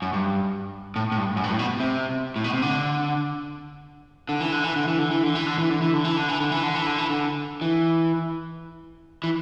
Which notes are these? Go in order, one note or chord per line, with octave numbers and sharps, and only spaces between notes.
F#2
G2
A2
A2
G2
F#2
G2
A2
B2
C3
A2
B2
C3
D3
D3
E3
D3
E3
D3
E3
D3
E3
D3
E3
D3
E3
D3
E3
D3
E3
D3
E3
D3
E3
D3
E3
D3
E3
D3
E3
E3